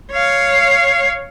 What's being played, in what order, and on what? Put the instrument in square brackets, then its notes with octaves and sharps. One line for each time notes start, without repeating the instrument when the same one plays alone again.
[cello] C#5 F5